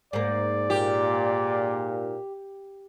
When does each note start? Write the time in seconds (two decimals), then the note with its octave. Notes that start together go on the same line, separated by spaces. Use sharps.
0.13 G#2 A#3 D5
0.70 A#2 G4